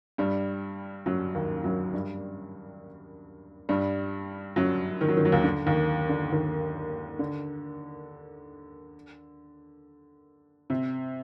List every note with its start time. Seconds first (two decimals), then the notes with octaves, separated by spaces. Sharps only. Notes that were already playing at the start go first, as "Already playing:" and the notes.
0.18 G2 G3
1.06 F#2 F#3
1.35 D#2 D#3
1.64 F#2 F#3
1.93 G2 G3
3.69 G2 G3
4.56 F#2 F#3
5.01 D#3
5.08 F#3
5.17 D#3
5.25 F#3
5.32 D#2 D#3
5.44 D3
5.66 D#2 D#3
6.09 D3
6.32 D#2 D#3
7.19 D3
10.70 C3